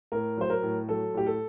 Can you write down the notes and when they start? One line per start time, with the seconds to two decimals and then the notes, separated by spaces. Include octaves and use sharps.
0.12 A2 A#4
0.38 F#3 C5
0.50 A#4
0.63 A2
0.89 F#3 A4
1.14 A2 G4
1.26 A4